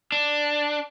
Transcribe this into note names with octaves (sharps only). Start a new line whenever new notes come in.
D4